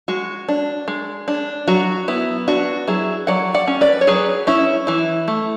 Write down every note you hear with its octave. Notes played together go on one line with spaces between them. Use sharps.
G#3 F#4
D4
G#3
D4
F#3 F#4
B3 E4
D4 F#4
F#3 E4 G#4
F#3 D5 F#5
D5 F#5
C#4
B4 D5
C#5
F#3 G#4 B4
C#4 E4
E3 E4
A3